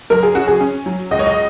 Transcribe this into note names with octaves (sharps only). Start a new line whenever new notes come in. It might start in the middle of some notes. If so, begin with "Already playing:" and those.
F#2 A#4
G#4
C#4 F#4
G#4
C#4
F#3
C#2 D#5
C#5
D#5